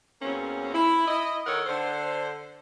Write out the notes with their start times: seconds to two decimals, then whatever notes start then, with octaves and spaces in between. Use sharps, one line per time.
0.22 E2 F#3 A#3 C4 C#4
0.74 E4
1.08 E4 D#5
1.46 D#3 A4 A#4 C#5 F#5
1.67 D3 C5